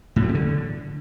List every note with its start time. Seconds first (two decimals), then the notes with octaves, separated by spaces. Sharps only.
0.16 A2
0.22 F#3
0.28 C#3
0.35 D3